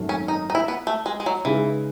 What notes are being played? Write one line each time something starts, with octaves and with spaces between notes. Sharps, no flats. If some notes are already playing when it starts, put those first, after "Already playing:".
Already playing: G#1 F#2 D#3 F#3 A3
C#4
D#4
D#4
E4
B3
A3
G#3
G#3
F#3
C#3 E3 G#3 D#4 G#4 B4